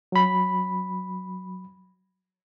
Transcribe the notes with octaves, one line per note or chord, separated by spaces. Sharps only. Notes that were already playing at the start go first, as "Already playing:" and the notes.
F#3 B5